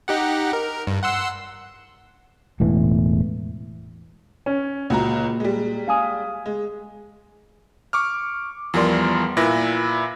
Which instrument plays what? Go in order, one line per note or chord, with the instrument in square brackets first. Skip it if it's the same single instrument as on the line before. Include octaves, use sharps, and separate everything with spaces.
[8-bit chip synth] D#4 G4 F#5
A#4
G2
F#5 C6 E6
[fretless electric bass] E1 A2 E3
[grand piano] C#4
[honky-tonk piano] C#2 F#4 A#5 [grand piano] A#2
[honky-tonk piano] G3 G#3
[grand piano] F5 G#5 D#6
[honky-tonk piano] G#3
[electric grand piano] C#6 D6 F6
E2 F3 G3 A#4 D5 C6
A#2 E4 B4 A#6